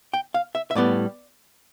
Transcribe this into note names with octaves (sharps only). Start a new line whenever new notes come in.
G5
F5
E5
E5
A2 G3 B3 D5